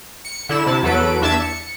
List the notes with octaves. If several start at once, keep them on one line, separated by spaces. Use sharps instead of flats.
C#7
D3 E4 E7
C3 E4 A5
E2 F#3 A4 B4 D7
E2 D4 E5 A5 G#6 E7
C#7